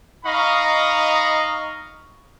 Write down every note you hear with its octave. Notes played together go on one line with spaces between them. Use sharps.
D#4 D#5 F5 A#5 B5 C#6